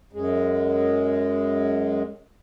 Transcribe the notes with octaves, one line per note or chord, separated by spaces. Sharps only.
F#2 G#3